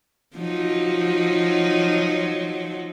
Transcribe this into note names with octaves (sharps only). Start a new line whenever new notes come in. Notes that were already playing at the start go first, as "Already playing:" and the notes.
F3 F#3 D#4